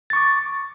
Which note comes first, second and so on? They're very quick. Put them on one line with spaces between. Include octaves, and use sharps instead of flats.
A6 C#6 D6